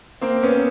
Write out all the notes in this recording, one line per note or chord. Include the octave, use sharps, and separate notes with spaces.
A#3 C4
B3 C#4